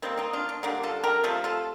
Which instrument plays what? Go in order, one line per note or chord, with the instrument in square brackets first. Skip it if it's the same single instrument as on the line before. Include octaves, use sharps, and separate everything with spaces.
[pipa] D#3 G3 A#3 C4
C4 D#4
D4 F4
D4
D3 G3 A#3 D4
F4 A4
G4 A#4
C3 F3 A3 F4 A4
F4 A4